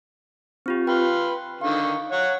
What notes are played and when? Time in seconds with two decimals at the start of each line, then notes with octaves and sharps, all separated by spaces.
0.66 C4 F4 G4
0.87 F4 B4 G5
1.61 D3 D#3 F5 C#6
2.12 C#5 F#5